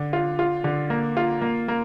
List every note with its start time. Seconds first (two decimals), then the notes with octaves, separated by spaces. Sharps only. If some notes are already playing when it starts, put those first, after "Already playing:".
Already playing: D3
0.13 F4
0.39 F4
0.64 D3
0.90 A#3
1.17 F4
1.41 A#3
1.68 A#3